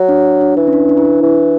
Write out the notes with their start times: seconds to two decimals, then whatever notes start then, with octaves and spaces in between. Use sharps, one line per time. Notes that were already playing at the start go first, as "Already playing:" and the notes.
Already playing: F#3
0.09 D4
0.41 D4
0.57 E3 E4
0.67 C#4
0.73 D4
0.89 D4
0.97 E4
1.05 D4
1.22 E3